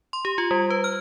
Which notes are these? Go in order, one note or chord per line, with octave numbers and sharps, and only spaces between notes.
C6
G4
F4
G3
B4
F6